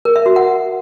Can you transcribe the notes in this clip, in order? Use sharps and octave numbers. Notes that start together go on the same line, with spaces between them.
A#4
E5
F#4
F#5